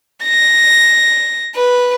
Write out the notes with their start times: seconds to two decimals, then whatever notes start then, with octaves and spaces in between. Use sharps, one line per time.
0.24 A#6
1.55 B4